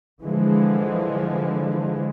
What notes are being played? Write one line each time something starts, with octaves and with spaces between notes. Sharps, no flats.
D3 E3 F3 G#3